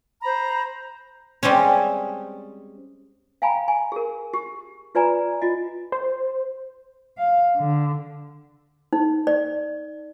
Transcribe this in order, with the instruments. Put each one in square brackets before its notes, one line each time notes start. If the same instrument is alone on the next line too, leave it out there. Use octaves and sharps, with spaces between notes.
[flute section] C5 A#5 B5
[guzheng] G3 G#3 C4 C#4
[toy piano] F5 G5 G#5 A#5 B5
G#5
G#4 A#4
G4
F4 B4 D5 G#5 A#5
F4 D#5
[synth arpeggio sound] C5
[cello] F5
D3
[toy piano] D#4
D5